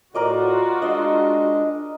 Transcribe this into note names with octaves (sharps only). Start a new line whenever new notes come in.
A2 F4 F#4 A#4 D5 D#5
G#3 D4 D#5